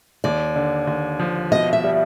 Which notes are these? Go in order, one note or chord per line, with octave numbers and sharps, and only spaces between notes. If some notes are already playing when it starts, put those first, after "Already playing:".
D#2 D5
D3
D#2
F3
B2 D#5
E5
G3